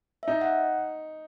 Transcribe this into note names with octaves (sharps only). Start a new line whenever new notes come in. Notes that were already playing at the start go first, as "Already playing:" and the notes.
E5
D#4 D#5
F#5